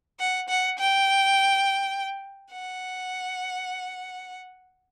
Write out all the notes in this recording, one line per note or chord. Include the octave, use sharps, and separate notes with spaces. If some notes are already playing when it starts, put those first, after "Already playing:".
F#5
F#5
G5
F#5